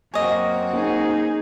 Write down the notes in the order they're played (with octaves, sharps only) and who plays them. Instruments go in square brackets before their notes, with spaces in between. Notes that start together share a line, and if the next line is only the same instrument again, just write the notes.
[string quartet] F#2 C4 F#4 [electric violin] A#3 [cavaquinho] C#5 D#5 [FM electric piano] G#5
[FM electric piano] A#3 C#4 [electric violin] D#4 G#4